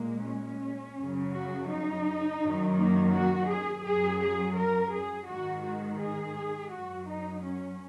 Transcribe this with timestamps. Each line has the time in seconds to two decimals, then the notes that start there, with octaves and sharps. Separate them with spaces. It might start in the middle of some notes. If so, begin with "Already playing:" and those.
Already playing: A#2 G#3 A#3
0.25 C#4
0.97 F#2 C#3 F#3
1.33 F#4
1.70 D#4
2.41 F#2 D#3 F#3
2.77 A#3
3.13 F#4
3.48 G#4
3.85 F#2 F#3 G#4
4.21 G#4
4.57 A#4
4.92 G#4
5.29 G#2 D#3 G#3 F#4
5.64 F#4
6.00 G#4
6.72 F#2 F#3 F#4
7.08 D#4
7.44 C#4